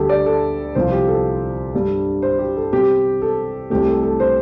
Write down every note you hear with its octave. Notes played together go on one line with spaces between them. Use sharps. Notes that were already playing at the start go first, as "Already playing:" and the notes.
Already playing: D2 D3 G3 G4 A4
D5
A4
C2 C3 F3 C5
G4
A4
G2 G3 D4
C5
G4
A4
C3 G3 C4 G4
A4
C2 C3 A3 G4
A4
A4
C5